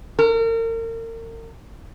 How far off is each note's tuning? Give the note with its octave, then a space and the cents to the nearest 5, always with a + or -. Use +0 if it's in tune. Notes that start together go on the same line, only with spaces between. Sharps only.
A#4 -40